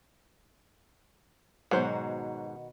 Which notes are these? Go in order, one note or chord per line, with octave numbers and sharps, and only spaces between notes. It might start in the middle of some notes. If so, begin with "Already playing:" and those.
G#2 B2 D#3 F#3 F#4 C5 F#5